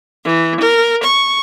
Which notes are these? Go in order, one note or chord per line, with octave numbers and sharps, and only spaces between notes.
E3
A#4
C#6